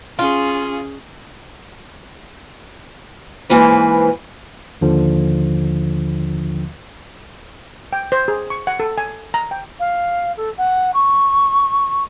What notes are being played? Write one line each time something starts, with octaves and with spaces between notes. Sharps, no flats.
C#4 F4 G#4
G#2 E3 A#3 B4 C5
D#2 D3 F3
G5
C5
G#4
C#6
F#5
A4
G#5
A#5
G5
F5
A4
F#5
C#6